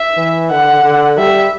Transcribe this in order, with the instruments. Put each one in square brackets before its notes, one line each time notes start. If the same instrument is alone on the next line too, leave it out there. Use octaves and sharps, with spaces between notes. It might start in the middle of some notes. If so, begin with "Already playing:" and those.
Already playing: [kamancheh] E5
[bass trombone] E3
[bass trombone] D3 [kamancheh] F#5
[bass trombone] D3
[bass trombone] G3 [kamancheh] E5